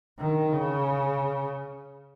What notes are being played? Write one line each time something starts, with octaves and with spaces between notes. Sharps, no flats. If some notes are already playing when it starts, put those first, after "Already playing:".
D#3
C#3